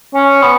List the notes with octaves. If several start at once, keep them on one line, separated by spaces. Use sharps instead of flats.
C#4
B3